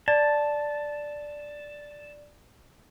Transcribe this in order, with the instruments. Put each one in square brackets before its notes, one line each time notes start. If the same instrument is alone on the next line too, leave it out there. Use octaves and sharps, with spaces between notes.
[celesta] D5 [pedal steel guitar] A5